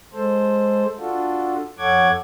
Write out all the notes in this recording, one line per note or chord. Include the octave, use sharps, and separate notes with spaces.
G#3 A4 C5
D4 F4 F#4 A4
F2 A4 C#5 F#5 D6 G#6